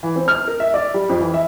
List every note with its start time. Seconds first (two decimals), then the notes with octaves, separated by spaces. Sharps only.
0.03 E3
0.16 C4
0.28 F6
0.48 A#4
0.60 E5
0.74 D5
0.94 G3
1.09 F2
1.21 E3
1.34 E5